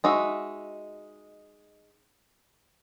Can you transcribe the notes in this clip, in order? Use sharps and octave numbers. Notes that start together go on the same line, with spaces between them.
G#3 D#4 F#4 E5